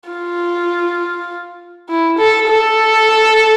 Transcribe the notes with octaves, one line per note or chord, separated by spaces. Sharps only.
F4
E4
A4
A4